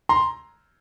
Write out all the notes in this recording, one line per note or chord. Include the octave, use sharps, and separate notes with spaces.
A#5 C6